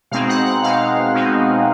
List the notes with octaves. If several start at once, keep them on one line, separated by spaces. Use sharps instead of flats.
B2 G#3 C4 D#4 F5
F#5
F#5
B2 G#3 C4 D#4 F5
B2 G#3 C4 D#4